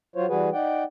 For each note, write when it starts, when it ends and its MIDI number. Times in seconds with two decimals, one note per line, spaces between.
0.16 0.26 54
0.16 0.26 65
0.16 0.26 72
0.16 0.26 73
0.29 0.49 52
0.29 0.49 55
0.29 0.49 66
0.29 0.49 68
0.29 0.49 71
0.53 0.84 63
0.53 0.84 74
0.53 0.84 78
0.53 0.84 79